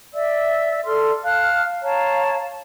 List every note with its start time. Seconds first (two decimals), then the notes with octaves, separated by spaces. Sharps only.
0.13 D5 E5 E6
0.85 A4 D5 C6 F6
1.24 F5 A5 F6 F#6
1.83 C#5 F5 A5 A#5